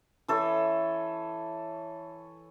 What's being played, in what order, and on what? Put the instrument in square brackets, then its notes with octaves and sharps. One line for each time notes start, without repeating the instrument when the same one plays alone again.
[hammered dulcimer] E3 A4 C#5